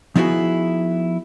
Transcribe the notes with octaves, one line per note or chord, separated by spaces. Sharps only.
F3 B3 D#4 E4 F#4 G#4